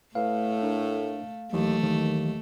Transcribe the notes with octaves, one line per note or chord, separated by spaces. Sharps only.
A2 A3 B4 F5
D4 A4 A#4
D#2 E3 F#3 A3
D#2 D#3